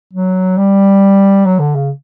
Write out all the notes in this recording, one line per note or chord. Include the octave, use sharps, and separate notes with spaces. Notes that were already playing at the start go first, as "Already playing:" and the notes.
F#3
G3
F#3
D3
C#3